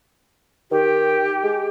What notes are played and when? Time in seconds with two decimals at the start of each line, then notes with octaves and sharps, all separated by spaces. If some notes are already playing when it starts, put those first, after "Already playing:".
0.71 D#3 G4
1.44 G#3